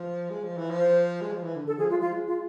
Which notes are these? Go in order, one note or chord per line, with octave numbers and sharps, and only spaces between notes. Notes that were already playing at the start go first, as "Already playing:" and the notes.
Already playing: F3
G#3
F3
E3
F3
C5
G#3
F3
E3
D3
D3 A4
F3 G#4
G#3 F4
F3 F4
G#3
F4